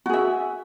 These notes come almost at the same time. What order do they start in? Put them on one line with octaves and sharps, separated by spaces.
F#4 G#4 E5